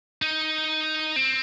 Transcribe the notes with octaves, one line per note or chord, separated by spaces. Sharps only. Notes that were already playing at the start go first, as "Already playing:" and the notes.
D#4
C4